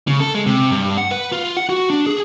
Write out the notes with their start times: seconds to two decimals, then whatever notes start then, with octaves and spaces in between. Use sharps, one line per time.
0.07 C#3
0.20 A4
0.35 G#3
0.46 C3
0.71 G2
0.98 F#5
1.11 B4
1.32 F4
1.57 F#5
1.69 F#4
1.90 D4
2.06 G#4